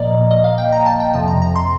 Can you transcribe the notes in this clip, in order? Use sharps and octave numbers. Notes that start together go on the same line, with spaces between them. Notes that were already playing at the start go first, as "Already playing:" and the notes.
Already playing: A#2 F3 A#3 D5 D#5 A#5
D#5
F5
G5
A#5
A5
G5
F2 C3 F3 A5
A#5
A#5
C6